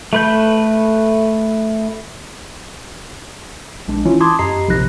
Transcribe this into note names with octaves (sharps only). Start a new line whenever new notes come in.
A3 B4 G6
A#1 G#3 D4
E3 C#4 E4 F4
A5 B5 C6 D6 D#6 G#6
F#2 G4 D#5 A#5 B5 C7
A#1 C3 F3 D#4 F#6 A#6